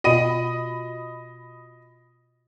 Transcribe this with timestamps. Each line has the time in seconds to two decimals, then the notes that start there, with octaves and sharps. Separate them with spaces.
0.04 B2 F4 F#4 D#5 B5 D#7